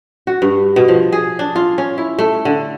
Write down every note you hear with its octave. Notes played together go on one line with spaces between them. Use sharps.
F#4
G2
B2
F3
G#4
D4
F4
C#4
E4
A3
D3